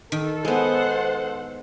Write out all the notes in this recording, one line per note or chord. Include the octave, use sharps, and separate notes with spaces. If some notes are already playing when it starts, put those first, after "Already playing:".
D#3 A4
G#3 B3 C5 F#5